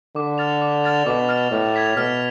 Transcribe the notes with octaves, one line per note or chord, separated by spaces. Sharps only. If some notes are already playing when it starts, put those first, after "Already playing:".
D3 D6
F6 A6 F7
D6
F6 A6 F7
B2 D6
F6 A6 F7
A2 F6
G#6 B6 F7
B2 F6